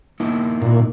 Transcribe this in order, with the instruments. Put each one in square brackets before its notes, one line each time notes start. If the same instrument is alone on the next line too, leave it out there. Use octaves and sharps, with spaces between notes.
[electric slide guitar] A#3 D#4 E4
[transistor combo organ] A#2